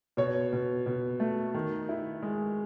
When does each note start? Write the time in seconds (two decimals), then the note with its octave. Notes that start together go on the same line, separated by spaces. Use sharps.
0.17 B2 C#5
0.53 B2
0.86 B2
1.20 A3
1.54 D#3
1.89 E4
2.22 G#3